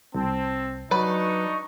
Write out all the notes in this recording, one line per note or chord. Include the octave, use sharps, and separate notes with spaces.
C2 C4 A5
F#3 D4 D#4 B4 D5 B5 C#6